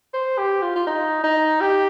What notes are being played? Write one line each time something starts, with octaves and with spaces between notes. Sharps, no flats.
C5
G4
F4
F4
D#4
D#4
G4